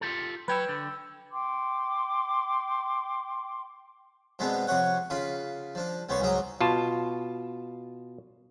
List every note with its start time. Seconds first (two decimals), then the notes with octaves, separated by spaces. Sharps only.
0.01 F4 G4 A4
0.48 F#3 B4 C#5 G5 E6
0.69 D3
1.31 G5 C6 D6
4.39 B2 G#3 B3 C4 D4
4.67 F2 C3 C#5 F#5
5.10 C#3 F4 B5
5.75 F3 D4
6.09 C2 B3 C5 C#5
6.20 C#2 G#2 F#3 D#5 A#5
6.60 B2 F4 A5